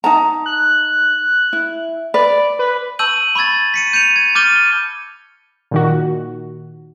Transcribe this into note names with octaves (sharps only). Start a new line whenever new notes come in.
D#4 A5 A#5
F#6
E4
B4 D5
B4
A5 C#6 E6 G6 D#7 F#7
B5 C#6 E6 G#6 A6
B6 C#7 D#7
G6 C#7 D#7 F7
G#6
D6 F6 G6 A6 D#7 G7
A#2 D#3 F#4